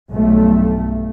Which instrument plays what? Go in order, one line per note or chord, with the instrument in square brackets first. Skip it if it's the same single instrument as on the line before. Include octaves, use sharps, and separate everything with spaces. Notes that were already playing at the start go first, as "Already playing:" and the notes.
[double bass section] B1 G2 A3